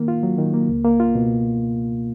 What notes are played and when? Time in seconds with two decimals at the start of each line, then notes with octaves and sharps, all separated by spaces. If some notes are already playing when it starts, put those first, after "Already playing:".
Already playing: D#3 A#3
0.08 F4
0.23 F#3
0.38 D#3
0.54 A#3
0.69 C#2
0.84 A#3
1.00 F4
1.15 B2